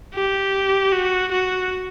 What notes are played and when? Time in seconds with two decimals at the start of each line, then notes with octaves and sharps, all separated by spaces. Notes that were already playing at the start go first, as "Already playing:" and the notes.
0.14 G4
0.92 F#4
1.32 F#4